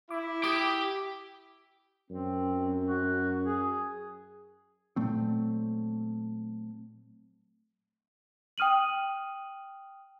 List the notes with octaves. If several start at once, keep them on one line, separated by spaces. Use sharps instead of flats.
E4 D6
G4 G5 D6 D#6 B6
F#2 C4
F#4
G#4
A#2 F#3 A3 C4
G5 D#6 F6 D#7 F#7